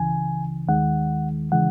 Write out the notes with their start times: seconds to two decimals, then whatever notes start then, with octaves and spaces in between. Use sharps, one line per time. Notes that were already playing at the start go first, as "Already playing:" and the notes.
Already playing: C#2 C#3 E3 G#5
0.67 D#2 D#3 G#3 F#5
1.52 C#3 E3 G#3 F#5